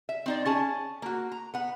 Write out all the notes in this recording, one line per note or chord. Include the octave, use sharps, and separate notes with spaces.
E5
C4 D#4 D5
C#4 G#4 A5
A#3 F#4
A#5
B3 F#5